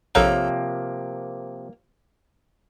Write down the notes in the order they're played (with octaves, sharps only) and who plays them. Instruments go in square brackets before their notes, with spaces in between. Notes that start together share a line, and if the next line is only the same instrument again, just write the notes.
[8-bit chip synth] A#1 A4 A#5 [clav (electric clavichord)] C3 F3 [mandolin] A#3 [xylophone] C#5